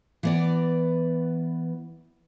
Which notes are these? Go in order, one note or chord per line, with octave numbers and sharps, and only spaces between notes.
E3 B3 D5